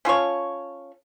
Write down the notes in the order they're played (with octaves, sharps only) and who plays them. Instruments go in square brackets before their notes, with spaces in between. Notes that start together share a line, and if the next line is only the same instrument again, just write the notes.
[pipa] C#4 F4 A4 C#5